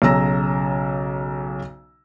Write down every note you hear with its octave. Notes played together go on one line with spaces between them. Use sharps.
B1 C#3 A#5 E6 A#6